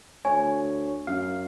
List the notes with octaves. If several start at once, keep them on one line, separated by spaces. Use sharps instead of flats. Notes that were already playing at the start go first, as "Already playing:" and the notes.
D2 C#5 G#5
F#2 F5